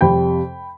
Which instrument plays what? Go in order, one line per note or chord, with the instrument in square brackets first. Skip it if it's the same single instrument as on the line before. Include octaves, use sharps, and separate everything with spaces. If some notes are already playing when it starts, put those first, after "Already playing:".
[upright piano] F2 C3 G3 G5 B5